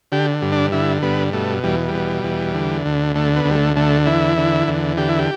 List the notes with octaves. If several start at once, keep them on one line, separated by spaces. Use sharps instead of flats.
D3 G4
G2
D4
D3 E4
G2 B3
B2 A3
E2 G3
G3
B2
E2
D3
D2
D3 A3
B3
D2
G3
A3
D3 A3
E2 E4
D3
E2
D3 G4
E4
G4